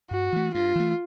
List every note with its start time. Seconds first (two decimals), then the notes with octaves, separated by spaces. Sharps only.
0.11 G2 F#4
0.33 E3 A3
0.54 G2 F4
0.76 E3 A3